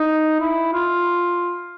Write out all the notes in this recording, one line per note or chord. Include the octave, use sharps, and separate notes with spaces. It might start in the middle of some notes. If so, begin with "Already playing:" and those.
Already playing: D#4
E4
F4